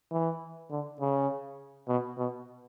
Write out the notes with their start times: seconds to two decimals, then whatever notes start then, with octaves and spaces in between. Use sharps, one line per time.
0.12 E3
0.71 D3
1.01 C#3
1.88 B2
2.18 B2